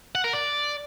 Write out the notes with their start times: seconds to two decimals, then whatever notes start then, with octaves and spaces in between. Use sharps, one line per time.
0.15 F#5
0.24 A#4
0.33 D5